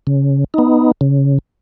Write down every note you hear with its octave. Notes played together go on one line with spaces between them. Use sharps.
C#3
B3 D#4
C#3